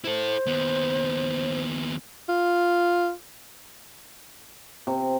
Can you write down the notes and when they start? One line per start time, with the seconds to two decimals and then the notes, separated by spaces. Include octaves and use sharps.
0.04 E4 A4 C5
0.46 D#2 B3
2.29 F4
4.87 C3